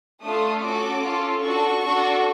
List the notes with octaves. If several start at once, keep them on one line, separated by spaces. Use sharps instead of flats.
A3 D4 F4 A4 D#6
C#4 F#4 A4 D6
C#4 F4 A4
D4 F#4 A4 C#6
D4 F#4 A4